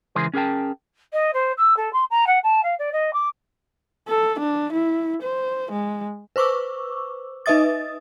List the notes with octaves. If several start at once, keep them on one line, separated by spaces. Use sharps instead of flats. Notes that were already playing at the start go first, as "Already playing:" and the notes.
C#2 E3 G#4 A#4 C5
C#4 G#4 A#4 G5 A5
D#5
C5
E6
A4
C6
A#5
F#5
A5
F5
D5
D#5
D6
A4
D4
E4
C5
G#3
B4 C5 C#6 D6 E6
D#4 B4 D#5 E5 D#6 A6